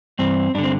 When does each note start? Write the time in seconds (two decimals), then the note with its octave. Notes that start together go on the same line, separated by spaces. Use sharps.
0.19 G2 E3 C4
0.55 G2 D3 D4
0.64 C4